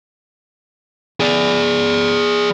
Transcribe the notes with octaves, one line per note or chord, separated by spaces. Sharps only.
G#4 D5